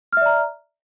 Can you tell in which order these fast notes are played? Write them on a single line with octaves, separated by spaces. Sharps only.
F6 E5 D5 A#5